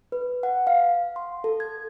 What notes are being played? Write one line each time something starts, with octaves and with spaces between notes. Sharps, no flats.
B4
F#5
F5
C6
A4
G#6